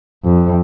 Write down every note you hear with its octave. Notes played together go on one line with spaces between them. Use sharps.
F2